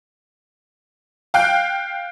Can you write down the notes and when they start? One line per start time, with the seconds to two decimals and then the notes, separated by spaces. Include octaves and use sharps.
1.34 F5 G5 F#6